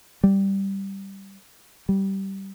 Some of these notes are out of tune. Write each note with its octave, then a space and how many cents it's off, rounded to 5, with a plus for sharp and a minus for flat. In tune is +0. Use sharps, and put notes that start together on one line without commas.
G3 -5
G3 -15